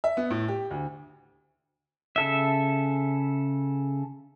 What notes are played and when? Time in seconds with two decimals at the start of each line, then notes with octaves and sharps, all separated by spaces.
0.04 E5
0.17 B3
0.31 A2
0.48 G4
0.71 D2
2.16 C#3 A4 E5